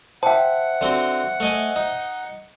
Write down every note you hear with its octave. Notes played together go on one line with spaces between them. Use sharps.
C5 E5 F#5 G5 A5
D3 C4 F#4
A3 D#5 G#5
D#4